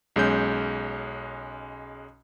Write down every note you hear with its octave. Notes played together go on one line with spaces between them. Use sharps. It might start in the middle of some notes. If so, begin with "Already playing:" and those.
B1 G#3 C#4 G6